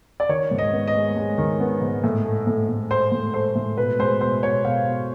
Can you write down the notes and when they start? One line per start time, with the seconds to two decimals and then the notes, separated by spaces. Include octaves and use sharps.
0.20 D5
0.29 D#3 C#5
0.51 G#2
0.58 D#5
0.73 B3
0.87 D#5
0.95 G#3
1.17 G#3
1.38 D#3
1.60 B3
1.82 G#2
2.04 A2
2.25 A3
2.47 A2
2.69 A2
2.91 A3 C5
3.12 A2
3.34 A3 C5
3.55 A2
3.78 B2 B4
3.99 G#3 C5
4.21 B2 C5
4.43 B2 C#5
4.64 B2 F5
4.86 B2